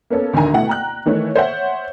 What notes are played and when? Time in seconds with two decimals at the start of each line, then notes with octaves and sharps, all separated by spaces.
0.10 A#3 B3 C#4 A4
0.33 D2 D3 D#3 G#5 A#5
0.53 B2 A3 E4 F#5
0.67 G5 A#5 F#6
1.06 D#3 E3 A3 C#5
1.36 C5 C#5 E5 F#5 G6